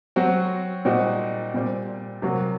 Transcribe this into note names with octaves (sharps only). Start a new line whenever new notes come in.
F#3 C4 F#4
A#2 G3 C4 D#4 F#4
A#2 G3 C4
C3 F#3 A#3 F#4